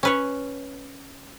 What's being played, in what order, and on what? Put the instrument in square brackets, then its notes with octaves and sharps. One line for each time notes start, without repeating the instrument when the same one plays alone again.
[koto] C#4 B4 C#5